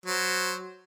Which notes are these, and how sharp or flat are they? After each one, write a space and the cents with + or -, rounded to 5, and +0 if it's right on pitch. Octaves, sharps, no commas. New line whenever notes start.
F#3 +0 C5 +0